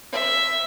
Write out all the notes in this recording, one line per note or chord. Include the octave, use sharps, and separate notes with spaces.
E5